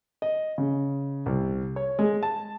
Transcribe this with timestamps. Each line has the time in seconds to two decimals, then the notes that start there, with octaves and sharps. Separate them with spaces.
0.22 D#5
0.58 C#3
1.26 C2
1.76 C#5
1.99 G#3
2.23 A5